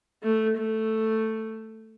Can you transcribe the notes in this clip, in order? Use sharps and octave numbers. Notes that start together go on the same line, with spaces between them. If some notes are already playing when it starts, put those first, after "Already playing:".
A3
A3